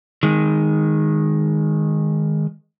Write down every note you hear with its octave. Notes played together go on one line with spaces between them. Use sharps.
D#3 G#3